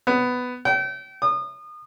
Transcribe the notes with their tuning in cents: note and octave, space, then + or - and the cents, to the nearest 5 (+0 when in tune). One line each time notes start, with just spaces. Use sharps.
B3 +10
G5 -35
D#6 -35